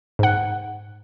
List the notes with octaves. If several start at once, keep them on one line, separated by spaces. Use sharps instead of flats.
G#2 F#5